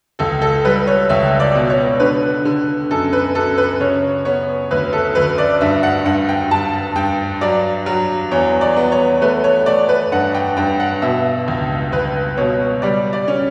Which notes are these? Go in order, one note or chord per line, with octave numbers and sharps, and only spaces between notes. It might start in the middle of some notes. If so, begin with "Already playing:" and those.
C#2 A4
A4
G3 B4
C#5
C#2 E5
D5
B2
C#5
D3 B4
D3
F#2 A4
B4
F#2 A4
B4
C#3 C#5
B3 C#5
D2 B4
A4
D2 B4
D5
G2 E5
F#5
G2 F#5
G5
G2 A5
G2 G5
F#3 D5
F#3
E2 C#5
D5
B3
C#5
A3 B4
C#5
A3 D5
B4
G2 F#5
G5
G2 G5
F#5
B2 E5
C#2
C#2 B4
B2 C#5
G3 D5
D5
C#4